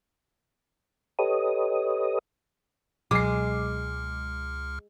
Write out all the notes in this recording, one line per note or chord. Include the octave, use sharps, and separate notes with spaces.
G4 A4 B4 C#5 D#5 D#6
C#2 B2 F#3 G#3 D6 F6 C7